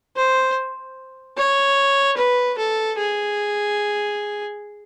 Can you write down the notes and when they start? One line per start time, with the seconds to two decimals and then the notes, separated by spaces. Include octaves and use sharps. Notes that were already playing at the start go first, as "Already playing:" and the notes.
0.17 C5
1.38 C#5
2.17 B4
2.59 A4
2.98 G#4